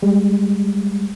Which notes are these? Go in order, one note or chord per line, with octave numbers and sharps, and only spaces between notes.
G3 G#3